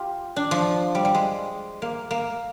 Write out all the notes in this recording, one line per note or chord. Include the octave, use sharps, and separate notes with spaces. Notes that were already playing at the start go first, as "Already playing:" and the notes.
Already playing: F4 G4
D4
F3
G3
G3
G#3
A#3
A#3